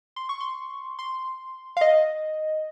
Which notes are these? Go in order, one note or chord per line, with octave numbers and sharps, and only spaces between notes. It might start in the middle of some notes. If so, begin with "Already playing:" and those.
C6
C#6
C6
C6
F5
D#5